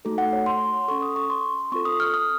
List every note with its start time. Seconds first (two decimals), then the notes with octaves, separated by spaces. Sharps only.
0.05 A3 D#4 F#4 A4
0.18 F#5
0.33 C#5
0.46 C6
0.88 C#4 A4 C#6
1.02 D#6
1.16 C#6
1.30 C6
1.72 C4 F4 A4 C#6
1.85 D#6
2.00 F6
2.14 D#6